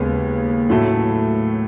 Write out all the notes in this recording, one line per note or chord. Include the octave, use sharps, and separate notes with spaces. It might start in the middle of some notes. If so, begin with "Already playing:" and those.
Already playing: D#2 C#3 G#3 B3
A2 F#3 A3